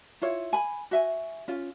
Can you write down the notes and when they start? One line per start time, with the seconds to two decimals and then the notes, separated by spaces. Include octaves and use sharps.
0.22 E4 F4 C#5
0.53 G#5 B5
0.91 F#4 E5 G#5
1.48 C#4 F4